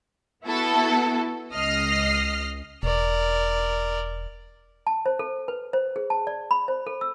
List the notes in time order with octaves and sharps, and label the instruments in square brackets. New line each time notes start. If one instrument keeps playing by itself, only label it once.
[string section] B3 E4 F#4 A4
C#2 D#5 F6 C7
[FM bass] E1 [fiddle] A#4 D5
[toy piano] A5
C5
A4
B4
C5
G#4
A5
D5
B5
C5
A4
E6